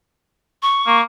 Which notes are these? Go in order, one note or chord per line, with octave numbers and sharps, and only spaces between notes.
C#6
A#3